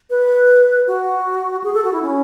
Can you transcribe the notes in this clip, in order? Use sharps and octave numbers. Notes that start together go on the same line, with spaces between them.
B4
F#4
G#4
A4
F#4
E4
C#4